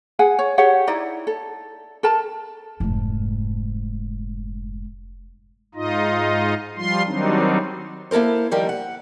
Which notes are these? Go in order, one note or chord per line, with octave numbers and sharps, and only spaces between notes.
G#4 F#5 G#5
C#5
G4 G#4 C#5 F#5
D#4 E4 D5 A#5
A4
A4 A#4 A5
F1 G#2
G#2 D#4 F4 D#5
F3 G3 F4 C6
D#3 F#3 G3 C4 D4 D#4
A#3 E4 A4 A#4 C5
D#3 F3 G3 G4 A#4
F#5